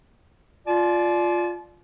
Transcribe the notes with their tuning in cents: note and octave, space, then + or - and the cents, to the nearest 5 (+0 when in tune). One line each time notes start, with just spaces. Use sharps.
F4 +0 D5 +0 A5 -45